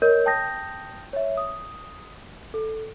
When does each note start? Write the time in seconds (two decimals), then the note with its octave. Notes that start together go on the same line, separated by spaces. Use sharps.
0.02 A#4 C#5 D#5 G6
0.26 G5 A5 D#6 G6 A#6
1.13 C#5 E5
1.37 D#6
2.54 A4